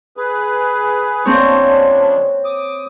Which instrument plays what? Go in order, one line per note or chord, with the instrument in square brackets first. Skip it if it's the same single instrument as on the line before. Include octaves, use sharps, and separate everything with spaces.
[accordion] G#4 B4
[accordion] C#3 F3 D4 [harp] C4 C#5
[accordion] D6 D#6